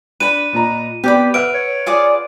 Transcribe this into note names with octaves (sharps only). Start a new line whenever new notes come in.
D4 B4 B5 D#7
A#2 D#5 A#5
B3 G4 D5 B5
B4 E5 F#5 F6 D7
C#5
F4 G#4 D5